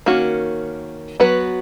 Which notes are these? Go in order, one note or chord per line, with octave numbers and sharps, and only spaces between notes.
D#3 A#3 C#4 F#4
F#3 B3 F#4 B4